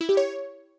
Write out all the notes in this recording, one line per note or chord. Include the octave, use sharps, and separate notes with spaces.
E4
G4
C#5